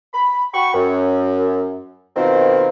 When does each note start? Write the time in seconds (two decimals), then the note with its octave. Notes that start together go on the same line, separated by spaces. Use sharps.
0.14 B5
0.53 F#4 G5 B5 C#6
0.74 F#2
2.16 B2 D#3 C4 F4